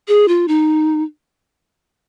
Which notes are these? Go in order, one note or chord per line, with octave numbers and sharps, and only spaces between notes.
G#4
F4
D#4